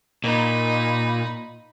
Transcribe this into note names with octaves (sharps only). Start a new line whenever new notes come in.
A#2 D#4 B5